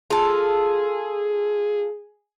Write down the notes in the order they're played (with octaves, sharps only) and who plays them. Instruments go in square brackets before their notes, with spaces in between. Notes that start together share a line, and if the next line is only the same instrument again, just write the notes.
[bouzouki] F4 A4 [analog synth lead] G#4